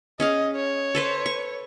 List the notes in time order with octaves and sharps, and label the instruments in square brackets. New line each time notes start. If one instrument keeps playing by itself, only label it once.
[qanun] C#4 G#4 F5 [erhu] D#5
[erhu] C#5
[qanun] A4 B4 C5
C#6